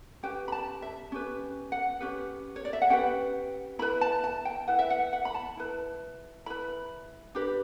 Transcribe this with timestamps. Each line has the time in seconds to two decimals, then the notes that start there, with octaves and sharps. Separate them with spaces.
0.23 C#4 G4 B4 G5
0.48 B5
0.52 A5
0.82 E5
1.12 C#4 G4 B4
1.72 F#5
2.00 C#4 G4 B4
2.56 C#5
2.65 D5
2.73 E5
2.82 F#5
2.90 C#4 G4 B4 G5
3.79 E4 B5
3.82 B4
4.01 A5
4.24 A5
4.45 G5
4.68 E4 B4 F#5
4.79 E5
4.90 F#5
5.13 F#5
5.25 B5
5.34 A5
5.57 E4 B4
6.46 E4 B4 B5
7.35 D4 G4 B4